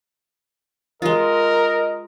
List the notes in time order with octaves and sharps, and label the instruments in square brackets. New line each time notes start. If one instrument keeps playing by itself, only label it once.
[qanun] G#3 F4 [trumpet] A#4 [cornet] D#5